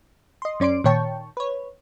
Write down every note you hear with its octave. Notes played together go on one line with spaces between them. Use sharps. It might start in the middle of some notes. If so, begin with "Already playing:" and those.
D#5 C6
F#2 C#4 D5 C6 D7
A#2 D#3 C#5 G5 A5 C#6
B4 C#5